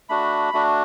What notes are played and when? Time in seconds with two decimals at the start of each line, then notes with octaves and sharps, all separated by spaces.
0.09 A3 D4 F#4 B5
0.53 A3 D4 F#4